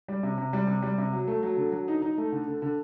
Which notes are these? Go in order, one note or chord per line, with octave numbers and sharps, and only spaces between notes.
G3
C3
C3
G3
C3
G3
C3
F#3
A3
F#3
D3
F#3
D#4
D#4
A3
D3
D3
D3